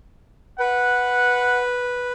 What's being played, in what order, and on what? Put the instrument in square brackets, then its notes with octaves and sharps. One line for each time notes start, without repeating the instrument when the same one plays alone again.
[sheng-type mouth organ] B4 [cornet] F#5